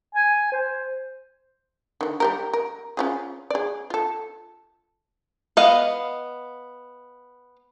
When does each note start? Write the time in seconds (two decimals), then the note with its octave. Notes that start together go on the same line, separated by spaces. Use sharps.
0.15 G#5
0.52 C5
2.01 D3 D#3
2.20 G3 G4 A#4
2.53 A#4
2.97 C#4 F4 G#4
3.50 G#4 D5
3.90 F4 A4
5.57 B3 D#5 F5